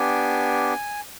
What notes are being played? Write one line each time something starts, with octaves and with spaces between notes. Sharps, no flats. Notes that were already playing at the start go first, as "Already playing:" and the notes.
Already playing: B3 D4 G4 G#5